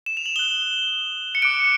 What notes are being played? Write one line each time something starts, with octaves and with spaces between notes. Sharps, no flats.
E7
F7
F#7
D#6 F#6 G7
C#7
D6 F#6 D7